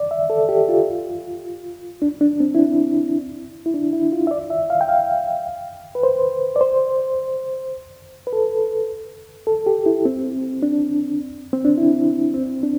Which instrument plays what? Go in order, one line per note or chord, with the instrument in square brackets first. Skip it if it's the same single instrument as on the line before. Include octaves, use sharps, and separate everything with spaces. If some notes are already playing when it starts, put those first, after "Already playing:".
Already playing: [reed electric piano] D5
E5
A4
G4
F4
D4
D4
C4
E4
D4
E4
D4
E4
F4
E5
D5
E5
F5
G5
F5
B4
C5
D5
C5
B4
A4
A4
G4
E4
C4
D4
C4
D4
E4
C4
D4